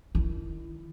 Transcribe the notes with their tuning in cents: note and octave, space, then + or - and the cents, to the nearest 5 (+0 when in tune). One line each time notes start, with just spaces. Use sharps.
D#3 +0 E4 +20